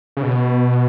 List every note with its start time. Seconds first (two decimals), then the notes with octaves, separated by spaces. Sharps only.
0.17 C#3
0.23 B2